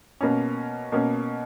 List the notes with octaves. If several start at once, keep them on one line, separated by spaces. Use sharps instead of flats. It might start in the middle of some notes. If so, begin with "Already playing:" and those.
B2 A#3 C#4
B2 A#3 C#4